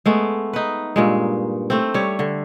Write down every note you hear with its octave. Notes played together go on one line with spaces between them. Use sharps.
G#3 A3 B3
D#4 B4
G2 A#2 G#3
A3 C4
G3 C#5
D3